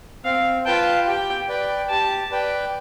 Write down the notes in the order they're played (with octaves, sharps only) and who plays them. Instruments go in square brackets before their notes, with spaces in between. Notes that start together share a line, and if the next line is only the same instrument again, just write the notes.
[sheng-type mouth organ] C4 [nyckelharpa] F5
[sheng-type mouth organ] F4 B4 F5 A5 [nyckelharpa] G5
[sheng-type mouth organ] G4 [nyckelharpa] G5
[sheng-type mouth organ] B4 D5 G5
[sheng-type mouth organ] G4 [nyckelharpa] A5
[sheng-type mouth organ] B4 D5 G5